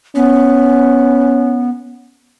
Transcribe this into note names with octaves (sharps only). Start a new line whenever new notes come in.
B3 C#4